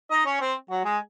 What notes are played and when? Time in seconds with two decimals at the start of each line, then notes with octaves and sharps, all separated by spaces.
0.11 D#4 D#5
0.26 C#4 C#5
0.40 C4 C5
0.70 F#3 F#4
0.84 G#3 G#4